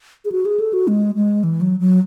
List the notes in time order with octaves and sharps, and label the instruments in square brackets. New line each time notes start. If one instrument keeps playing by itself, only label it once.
[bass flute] G#4
F#4
G#4
A4
F#4
G#3
G#3
E3
F#3
F#3